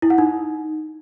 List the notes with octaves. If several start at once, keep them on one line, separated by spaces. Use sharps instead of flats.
E4
F#5
D#4